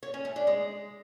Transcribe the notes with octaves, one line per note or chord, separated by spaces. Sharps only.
C#5
C#4
A3
D4
G#3